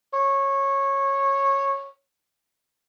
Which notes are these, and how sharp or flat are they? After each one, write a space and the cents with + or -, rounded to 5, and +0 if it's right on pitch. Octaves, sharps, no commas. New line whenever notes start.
C#5 -15